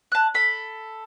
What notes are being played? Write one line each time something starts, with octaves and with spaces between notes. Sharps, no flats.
A5 F#6
A4 B5